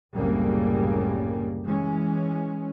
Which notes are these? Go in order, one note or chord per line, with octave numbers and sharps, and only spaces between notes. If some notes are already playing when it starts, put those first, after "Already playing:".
F#1 C2 A2 C#3 G3 A#3
E3 G#3 C#4